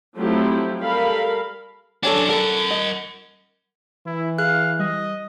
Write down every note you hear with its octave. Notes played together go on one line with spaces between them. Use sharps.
F3 F#3 A3 C4 E4 G4
G3 A4 A#4 F5 B5
F#2 D4 A4 C#5 G#5
A4 A#4 F#5
D#5
E3 E4
G#4 F5 F#6
G3 D#5